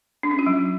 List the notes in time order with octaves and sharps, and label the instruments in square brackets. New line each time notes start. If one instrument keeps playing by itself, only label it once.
[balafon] D4
C#4
F4
F#3